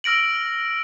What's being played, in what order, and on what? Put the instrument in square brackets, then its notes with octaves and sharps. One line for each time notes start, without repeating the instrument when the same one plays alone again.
[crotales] E6 F6 A#6 D7 F#7